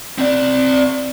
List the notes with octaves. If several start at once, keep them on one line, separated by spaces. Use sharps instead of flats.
C4 D5